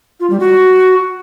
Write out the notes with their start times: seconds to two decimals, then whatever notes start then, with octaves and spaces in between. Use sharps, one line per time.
0.20 F4
0.30 G3
0.40 F#4